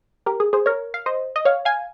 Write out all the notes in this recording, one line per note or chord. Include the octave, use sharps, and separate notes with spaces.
G4 A#4
G#4
G#4 C5
A#4 C#5
F5
C5 D#5
D#5
C#5 F5
F5 G#5